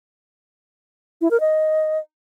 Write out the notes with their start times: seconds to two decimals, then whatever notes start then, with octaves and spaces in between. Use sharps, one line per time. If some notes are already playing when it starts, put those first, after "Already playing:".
1.21 E4
1.31 A#4
1.40 D#5